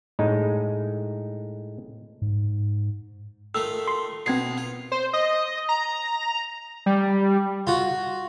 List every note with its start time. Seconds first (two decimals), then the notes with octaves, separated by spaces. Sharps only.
0.19 A2 G#3 D#4
2.22 G#2
3.55 D#3 A3 F4 A4 E6
3.87 C6 C7
4.26 B2 C4 D#4 G#6 C7
4.58 F4
4.92 C5
5.13 D#5
5.69 A#5
6.86 G3
7.67 F4 F#4